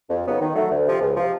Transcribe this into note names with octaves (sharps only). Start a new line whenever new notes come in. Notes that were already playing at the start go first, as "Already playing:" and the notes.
F2
C#3 F#3 B3 D#4
D#3
F#3 A3
D2
C3 F3
C#2
C3 F3